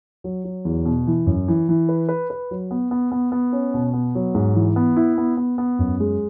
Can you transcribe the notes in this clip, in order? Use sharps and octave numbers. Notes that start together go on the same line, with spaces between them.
F#3
F#3
E2
B2
E3
F#2
E3
E3
B4
B4
B4
F#3
B3
B3
B3
B3
C#4
B2
B3
F#3
G#2
E3
B3
E4
B3
B3
B3
F#2
G#3